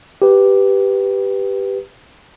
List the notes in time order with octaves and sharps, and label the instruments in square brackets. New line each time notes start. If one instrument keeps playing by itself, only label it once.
[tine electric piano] G4 B4